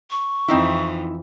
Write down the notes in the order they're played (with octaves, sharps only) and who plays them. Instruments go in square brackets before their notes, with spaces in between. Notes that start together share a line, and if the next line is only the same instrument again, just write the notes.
[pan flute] C#6
[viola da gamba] F2 E3 [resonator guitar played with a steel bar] C4 D#4 E4